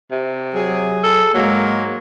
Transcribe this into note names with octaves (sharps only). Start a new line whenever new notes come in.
C3
F#3 G#4
A4
G#2 F#3 G#3 A#3